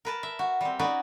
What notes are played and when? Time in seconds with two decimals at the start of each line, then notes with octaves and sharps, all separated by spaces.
0.05 A#4 B4 A5
0.23 E5
0.39 F#4
0.61 G3 C4
0.79 C#4 D#4 F#4 B4 D5